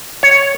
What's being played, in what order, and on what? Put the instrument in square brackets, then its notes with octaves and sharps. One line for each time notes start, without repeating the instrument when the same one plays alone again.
[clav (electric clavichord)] C#5